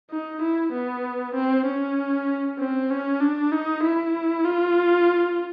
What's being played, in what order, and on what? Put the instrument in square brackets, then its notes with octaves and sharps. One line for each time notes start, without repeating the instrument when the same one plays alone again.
[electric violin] D#4
E4
B3
C4
C#4
C4
C#4
D4
D#4
E4
F4